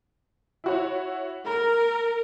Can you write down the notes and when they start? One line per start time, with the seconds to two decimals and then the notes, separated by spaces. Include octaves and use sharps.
0.64 E4 F#4 C#5
1.46 A#4 A#5